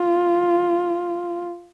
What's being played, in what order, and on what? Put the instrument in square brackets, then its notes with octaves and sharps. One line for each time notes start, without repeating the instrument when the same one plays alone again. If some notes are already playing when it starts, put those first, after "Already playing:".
Already playing: [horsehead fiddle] F4